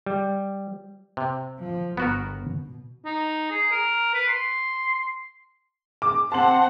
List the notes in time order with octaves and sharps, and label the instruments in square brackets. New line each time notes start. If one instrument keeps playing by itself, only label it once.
[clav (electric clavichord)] G3
C3
[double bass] F3
[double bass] G1 [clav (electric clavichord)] B3 F#4 A#4
[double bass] B2
[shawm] D#4
G#4
A#4
B4
C6
[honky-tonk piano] D6
[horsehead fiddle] C4 F#5 [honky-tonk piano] A5 C6 F#7